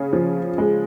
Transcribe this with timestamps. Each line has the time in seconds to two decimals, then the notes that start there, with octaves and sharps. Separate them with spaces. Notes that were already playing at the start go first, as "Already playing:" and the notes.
Already playing: C#3 C#4 G#4
0.13 F3
0.58 G#3